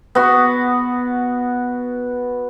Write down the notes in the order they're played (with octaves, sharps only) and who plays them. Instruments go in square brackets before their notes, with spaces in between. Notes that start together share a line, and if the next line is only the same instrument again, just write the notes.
[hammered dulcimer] B3 F#4